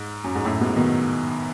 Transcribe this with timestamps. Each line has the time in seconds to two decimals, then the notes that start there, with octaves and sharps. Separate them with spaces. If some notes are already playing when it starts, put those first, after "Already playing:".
Already playing: G#2
0.24 F#2
0.35 G#2
0.45 F#2 A2
0.60 G#2 B2
0.76 B2 D#3